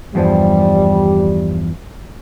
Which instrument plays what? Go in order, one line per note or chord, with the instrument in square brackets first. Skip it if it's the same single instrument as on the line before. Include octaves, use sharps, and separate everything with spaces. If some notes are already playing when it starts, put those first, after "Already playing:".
[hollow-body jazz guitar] E2 G2 F3 [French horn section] G3